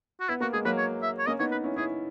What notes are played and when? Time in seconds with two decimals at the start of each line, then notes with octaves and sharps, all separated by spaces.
0.20 F#4
0.29 B3 E4
0.40 A#3 F#4
0.53 G#3 G#4
0.65 F#3 A#3 B4
0.78 C#5
1.02 E5
1.19 C#5
1.27 A#3 C#4 D#5
1.40 B3 D#4 C#5
1.52 B4
1.64 C#4 E4
1.76 C#4 E4 G#4